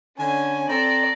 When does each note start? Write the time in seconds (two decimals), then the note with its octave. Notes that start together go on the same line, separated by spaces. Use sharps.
0.18 D3 C#4 G#5
0.69 C4 A4 D5 A#5